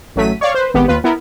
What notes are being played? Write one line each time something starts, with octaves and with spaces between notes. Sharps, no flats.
A1 F#3 A3 B6 D#7
C#5 D5 F5 C#6
B4 C5
G#1 B3 G4
D#2 F4 B4
B3 E4 A#4